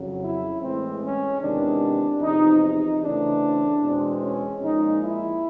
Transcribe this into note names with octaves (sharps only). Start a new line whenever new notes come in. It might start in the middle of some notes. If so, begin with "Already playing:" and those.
Already playing: F2 C#3 F#3
E4
A2 E3 G#3 C4
C#4
E2 C3 D#3 G#3 D4
E2 C3 F3 D#4
D#4
C#3 E3 A3 C4 D4
E2 B2 G#3 C4
C#4
A#2 F3 G#3 D#4
E4